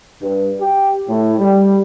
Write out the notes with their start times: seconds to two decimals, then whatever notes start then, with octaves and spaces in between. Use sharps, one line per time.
0.22 G2
0.61 G4
1.08 A2
1.39 G3